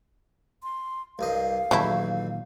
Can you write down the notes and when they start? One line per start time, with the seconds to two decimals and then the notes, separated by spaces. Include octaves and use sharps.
0.63 C6
1.19 C2 G2 D#5 F5
1.71 B1 E2 A#2 D#3 F#3 A3 E4